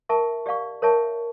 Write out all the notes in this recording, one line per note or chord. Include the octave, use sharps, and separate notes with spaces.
A#4 E5 A5 C#6
G4 D5 F5 C#6
A#4 C#5 E5 A5 C#6